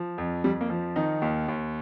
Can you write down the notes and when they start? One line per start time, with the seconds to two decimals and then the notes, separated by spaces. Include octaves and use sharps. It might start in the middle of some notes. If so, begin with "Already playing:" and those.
Already playing: F3
0.18 F2
0.44 F2 G3
0.61 A#3
0.70 F3
0.96 D#3 D#4
1.22 D#2
1.48 D#2